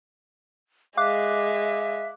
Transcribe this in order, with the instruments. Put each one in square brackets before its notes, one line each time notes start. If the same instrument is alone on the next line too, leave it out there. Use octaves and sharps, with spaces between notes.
[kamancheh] G#3 [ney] E5 [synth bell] F5 D6 F#6